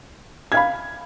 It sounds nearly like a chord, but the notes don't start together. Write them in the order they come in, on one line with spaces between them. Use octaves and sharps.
G#6 F5 B5